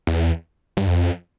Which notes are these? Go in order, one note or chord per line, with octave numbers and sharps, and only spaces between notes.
E2
G2
F2